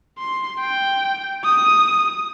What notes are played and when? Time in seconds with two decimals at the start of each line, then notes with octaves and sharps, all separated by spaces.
0.19 C6
0.61 G5
1.44 D#6